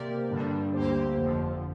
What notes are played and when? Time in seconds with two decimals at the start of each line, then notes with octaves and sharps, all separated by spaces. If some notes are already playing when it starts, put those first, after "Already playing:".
Already playing: C3 A#3 G4 A#4 D5
0.30 G2 D3 G3 D4
0.74 D2 D3 A#3 G4 C5
1.17 G1 F2 D3 F3